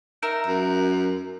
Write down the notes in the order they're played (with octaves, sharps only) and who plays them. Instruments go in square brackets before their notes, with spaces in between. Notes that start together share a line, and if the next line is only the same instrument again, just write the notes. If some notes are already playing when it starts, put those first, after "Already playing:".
[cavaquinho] D#4 A#4 E5
[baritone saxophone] F#2